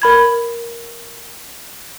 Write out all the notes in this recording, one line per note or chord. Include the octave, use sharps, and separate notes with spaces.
A#4 B5 G#6